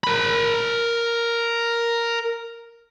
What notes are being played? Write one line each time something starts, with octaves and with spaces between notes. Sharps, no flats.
A#4 B5